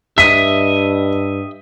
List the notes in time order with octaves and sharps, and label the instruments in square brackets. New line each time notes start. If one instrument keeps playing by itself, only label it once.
[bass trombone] G2 [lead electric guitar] D#5 E5 [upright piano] B6